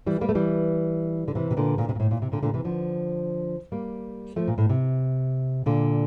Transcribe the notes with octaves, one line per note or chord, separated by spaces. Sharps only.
E3 G3
G3 A#3
A3
E3 G3
D3
C3 E3
C3
A#2 D3
A#2 D3
C3
A#2
A2
A#2
C3
A#2 D3
A#2 D3
C3 E3
D3 F3
G3 A#3
F3 A3
A#2
A2
C3
A#2 D3